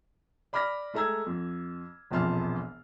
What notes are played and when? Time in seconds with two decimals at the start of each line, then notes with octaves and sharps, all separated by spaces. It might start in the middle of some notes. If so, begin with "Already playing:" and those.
0.53 D5 B5 D6 F6 A#6
0.94 G#3 A3 A4 A#5 E6 G#6
1.26 F2
2.11 E1 A#1 F2 A5 C6 F6